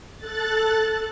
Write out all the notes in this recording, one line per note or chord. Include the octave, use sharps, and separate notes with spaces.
A4 F#6 A6